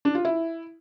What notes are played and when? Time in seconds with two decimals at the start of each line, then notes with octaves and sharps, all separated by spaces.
0.05 D4
0.15 F4
0.25 E4